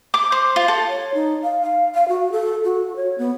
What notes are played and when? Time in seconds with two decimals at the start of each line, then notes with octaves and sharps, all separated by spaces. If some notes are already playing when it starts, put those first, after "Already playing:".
0.14 D6
0.32 C5
0.56 F4
0.68 A4
0.88 C#5
1.14 D#4
1.43 F5
1.62 F5
1.94 F5
2.08 F#4
2.32 A4
2.64 F#4
2.96 C#5
3.18 B3